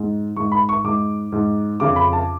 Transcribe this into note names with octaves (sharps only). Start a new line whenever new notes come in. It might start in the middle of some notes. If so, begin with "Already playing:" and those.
Already playing: G#2
G#2 C#6
B5
C#6
G#2 D6
G#2
F2 C#3 D6
B5
A5